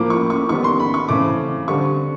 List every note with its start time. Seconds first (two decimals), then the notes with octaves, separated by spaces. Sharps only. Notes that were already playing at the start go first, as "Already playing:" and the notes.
Already playing: A2 F3 A#3 D6
0.10 C#6
0.30 C#6
0.49 D#3 G3 B3 C#6
0.64 C6
0.79 B5
0.94 C#6
1.09 C#3 E3 A3 C4 D6
1.68 D3 G3 C4 C#6